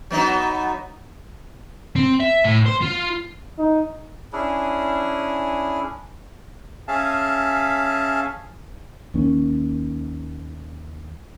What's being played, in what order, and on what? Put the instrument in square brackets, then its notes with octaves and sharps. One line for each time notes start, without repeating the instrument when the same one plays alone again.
[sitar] F#3 B3 D#4
[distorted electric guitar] C4
E5
A2
C5
F4
[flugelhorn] D#4
[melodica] C#4 D4 E4 G#4
[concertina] C#4 G#4 E5 F5 A5
[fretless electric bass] D#2 D#3 A#3 C#4